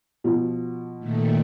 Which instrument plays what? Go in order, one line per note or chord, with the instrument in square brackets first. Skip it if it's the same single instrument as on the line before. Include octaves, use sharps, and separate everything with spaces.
[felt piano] B2 F3
[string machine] A#2 D#3 A3